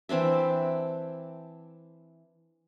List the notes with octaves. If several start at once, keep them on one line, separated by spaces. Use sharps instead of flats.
E3 C4 D4 E5